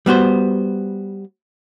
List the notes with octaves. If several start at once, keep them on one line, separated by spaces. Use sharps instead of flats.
G3 B3 F#4 C5